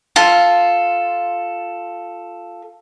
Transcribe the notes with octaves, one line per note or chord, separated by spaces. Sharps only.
F4 A4